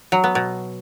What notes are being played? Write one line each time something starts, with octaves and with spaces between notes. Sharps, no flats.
F#3
B3
B2